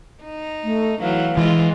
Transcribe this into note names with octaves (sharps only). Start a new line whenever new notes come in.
D#4
A3
E3 F#3 F5
E3 G#3 F4